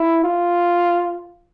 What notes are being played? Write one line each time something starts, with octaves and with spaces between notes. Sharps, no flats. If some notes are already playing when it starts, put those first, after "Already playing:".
Already playing: E4
F4